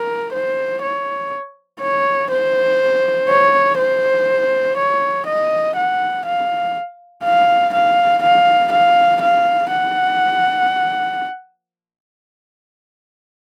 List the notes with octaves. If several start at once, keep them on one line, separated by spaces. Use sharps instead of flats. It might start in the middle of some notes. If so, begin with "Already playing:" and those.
Already playing: A#4
C5
C#5
C#5
C5
C#5
C5
C#5
D#5
F#5
F5
F5
F5
F5
F5
F5
F#5